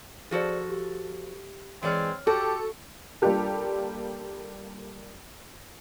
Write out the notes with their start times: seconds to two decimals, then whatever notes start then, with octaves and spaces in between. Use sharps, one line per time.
0.31 F3 F#4 G#4 A4 C5 D5
0.70 G4
1.83 E3 G#3 C4 C#5 D5 F6
2.27 F#4 G4 A4
3.22 G3 A#3 D4 F4 G4 A4